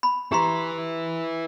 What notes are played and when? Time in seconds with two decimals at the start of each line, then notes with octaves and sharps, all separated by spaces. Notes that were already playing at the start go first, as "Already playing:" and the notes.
0.03 B5
0.32 E4 G4 B4 A#5 C6